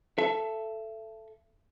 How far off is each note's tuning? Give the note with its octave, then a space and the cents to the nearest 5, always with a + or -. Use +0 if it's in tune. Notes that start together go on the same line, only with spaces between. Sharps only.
A4 +0 E5 +30